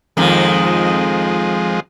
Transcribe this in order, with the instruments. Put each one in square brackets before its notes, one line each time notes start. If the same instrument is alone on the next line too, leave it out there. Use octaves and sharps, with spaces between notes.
[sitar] F2 D#3 [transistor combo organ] F3 G#3